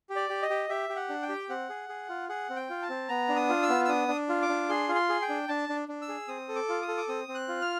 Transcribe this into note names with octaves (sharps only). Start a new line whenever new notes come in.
G4
D5
G4
D#5
G4
G4 E5
G4
F#5
D4
G5
G4
C4 F#5
G#4
G#4
F4
G#4 F#5
C4
G5
F4
A5
C4
B3 A#5
D4
D#6
F4
E6
B3
E6
D4 D#6
D4
F4
D6
D4
G#4 C6
F4
C6
G#4
G5
D4
D4 A5
D4
D4
E6
G#4
C4 D#6
A4
D6
F4
D#6
A4
D6
C4 D#6
C4
F#6
F4
F6